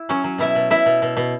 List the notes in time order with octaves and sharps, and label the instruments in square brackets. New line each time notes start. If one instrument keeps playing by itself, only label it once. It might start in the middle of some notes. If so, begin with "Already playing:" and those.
Already playing: [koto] E4
F#3 C#4 C#5
F#3
B2 E4 E5
B2
B2 E4 E5
B2
B2
B2